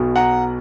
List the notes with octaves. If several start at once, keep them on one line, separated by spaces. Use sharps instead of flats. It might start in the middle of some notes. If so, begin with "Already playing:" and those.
Already playing: B1 B2 F#3
F#5 A#5